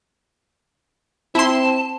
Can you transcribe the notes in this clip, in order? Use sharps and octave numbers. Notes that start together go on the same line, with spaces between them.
C4 E4 A5 C6